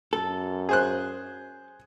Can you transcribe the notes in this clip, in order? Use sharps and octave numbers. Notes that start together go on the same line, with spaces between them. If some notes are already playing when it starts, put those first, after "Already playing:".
F#2 A4
G#4 C5 F#6